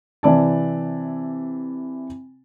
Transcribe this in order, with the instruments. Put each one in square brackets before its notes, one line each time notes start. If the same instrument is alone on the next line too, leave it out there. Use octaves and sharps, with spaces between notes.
[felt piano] C3 E3 D5 A5